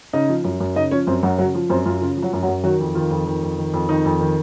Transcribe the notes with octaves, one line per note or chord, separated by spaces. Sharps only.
C#3 D#4 D#5
F3
F#2
F#2
C#3 D#4 D#5
F3 C#4 C#5
F#2 C4 C5
F#2 F#3 F#4
C#3 F#3 F#4
F3
F#2 C4 C5
F#2 F4
C#3 F4
F3
F#3 F#4
F#2
F#3 F#4
F#2
D#3 F#3 F#4
F2
D#3 F4
F2
D#3
F2
D#3
F2
D#3 D#4
F2
D#3